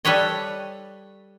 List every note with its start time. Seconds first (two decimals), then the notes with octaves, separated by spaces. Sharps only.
0.05 G3 A4 B4 C#5 D#5